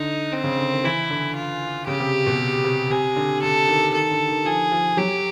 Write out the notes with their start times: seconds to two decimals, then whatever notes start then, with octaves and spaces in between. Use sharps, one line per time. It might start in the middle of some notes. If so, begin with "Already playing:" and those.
Already playing: D3 D#4
0.32 C4
0.44 C#3
0.58 D3
0.71 D#3
0.84 E3 E4
1.10 D3
1.35 F4
1.87 C#3 G4
2.00 C3
2.26 B2
2.65 C3
2.90 C3 G#4
3.16 D3
3.42 D3 A4
3.68 D#3
3.94 D#3 A4
4.11 D3
4.28 D#3
4.45 F3 G#4
4.72 F3
4.97 F#3 G4